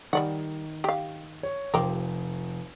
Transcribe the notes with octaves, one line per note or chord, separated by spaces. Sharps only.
D#3 G3 D5 F#5
G4 F5
C#5
F1 F3 G4 A#4